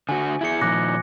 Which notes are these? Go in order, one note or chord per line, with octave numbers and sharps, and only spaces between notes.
D3 F#4 G#5
E4 G#4 G#6 C#7
A#2 D#3 F3 D6 F#6 A#6